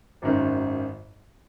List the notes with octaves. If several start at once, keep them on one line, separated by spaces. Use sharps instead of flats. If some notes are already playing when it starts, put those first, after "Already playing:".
G#1 F#2 D#3